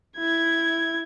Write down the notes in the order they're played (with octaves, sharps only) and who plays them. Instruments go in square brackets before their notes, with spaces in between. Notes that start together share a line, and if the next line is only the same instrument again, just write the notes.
[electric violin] E4 G#6